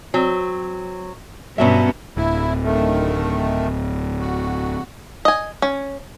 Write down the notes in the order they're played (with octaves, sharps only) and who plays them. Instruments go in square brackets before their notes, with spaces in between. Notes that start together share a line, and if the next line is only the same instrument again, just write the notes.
[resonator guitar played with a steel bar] F#3 C4
[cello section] G2 B3 C#4 [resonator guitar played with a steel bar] B2 F#3 E5
[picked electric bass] D1 [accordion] E4
[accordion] D#3 A3
F#4
[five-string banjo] D#5 G#5
C#4